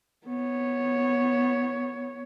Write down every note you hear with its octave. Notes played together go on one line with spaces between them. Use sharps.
B3 C#5